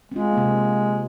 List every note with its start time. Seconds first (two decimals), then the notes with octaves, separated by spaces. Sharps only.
0.12 G#3 C4 F4
0.33 C3 A#3